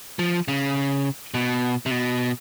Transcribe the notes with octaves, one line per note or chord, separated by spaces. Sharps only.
F3
C#3
B2
C3
B2